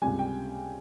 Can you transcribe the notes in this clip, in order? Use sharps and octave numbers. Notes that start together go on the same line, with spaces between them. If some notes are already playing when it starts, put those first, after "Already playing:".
C#2 C3 G3 G#5
G5